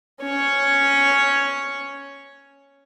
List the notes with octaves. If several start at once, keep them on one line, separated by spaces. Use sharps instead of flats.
C#4 C#5